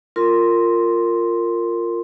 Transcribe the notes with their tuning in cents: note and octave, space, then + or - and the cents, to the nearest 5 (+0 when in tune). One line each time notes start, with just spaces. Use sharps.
F4 +0 A#4 -20 C6 +0